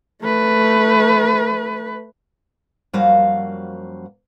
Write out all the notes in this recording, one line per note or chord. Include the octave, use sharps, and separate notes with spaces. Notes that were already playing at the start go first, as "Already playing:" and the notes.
A3 B4
F#2 F3 G3 A#3 F#4 F5